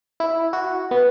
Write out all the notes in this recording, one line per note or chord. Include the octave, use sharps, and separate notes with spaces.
E4
F#4
B3